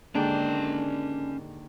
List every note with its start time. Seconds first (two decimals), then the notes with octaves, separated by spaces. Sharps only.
0.15 D#2 G#2 D3 C#4 D4 G5